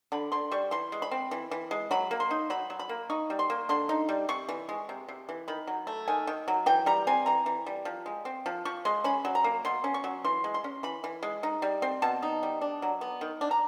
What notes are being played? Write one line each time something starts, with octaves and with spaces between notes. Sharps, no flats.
D3 B5
D3 C6
G3 C#6
E3 C6
G#3
B5
C4
E3
E3
G#3
F#3 B5
A#3
C6
D#4
F#3 B5
F#3
B5
A#3
D#4 C#6
G3
C6
A#3
D3 C6
D#4
G3
C3 C#6
E3
G#3
C3
C3
E3
D#3 B5
F#3
A3
D#3 G#5
D#3
F#3
E3 G5
G3 A#5
C4 G#5
E3 A#5
E3
G3
F3
G#3
C4
F3
F3 C#6
G#3 C6
C#4 B5
F#3
A#5
A#3
B2 C6
C#4
C#6
F#3
E3 C6
G#3
C6
C#4
E3 B5
E3
G#3
D#4
G3
C4
B2 A5
D#4
G3
D4
F#3
B3
D#3
D4
A#5